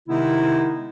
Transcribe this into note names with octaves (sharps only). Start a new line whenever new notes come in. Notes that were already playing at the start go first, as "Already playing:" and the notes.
C3 D#3 G#3 B3 D#4 E4